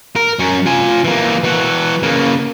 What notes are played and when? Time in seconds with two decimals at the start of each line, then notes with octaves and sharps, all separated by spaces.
0.16 A#4
0.39 F#2 C#4
0.66 F4 G#5
1.04 E3 A#3
1.44 E3 F#4
2.03 C#3 A#3